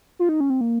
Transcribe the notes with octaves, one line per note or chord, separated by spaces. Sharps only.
F4
D#4
C#4
C4
A#3